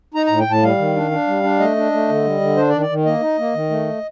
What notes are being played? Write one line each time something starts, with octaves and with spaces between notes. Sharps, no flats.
D#4 A#5
A2 A#5
G5
A2 A5
G3 F5
D#3
D4
D4
G3
D4
A3 D#5
D4
A3
D3
G3
D3
D4 C5
D5
D#3
D5
D#3
A#3 D#5
D#4
A#3
D#3
A3